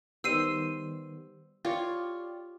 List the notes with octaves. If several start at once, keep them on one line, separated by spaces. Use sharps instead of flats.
D#3 G3 B3 C5 E6 C7 D#7
F4 G4 C#5 D5